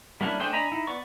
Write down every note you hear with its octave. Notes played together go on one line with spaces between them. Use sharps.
G3 A#3 C#4 D4 E4
A3 D4 G#4 C5 G5
D4 D#5 G#5 A#5 B5
D#4 E4
B3 D5 C#6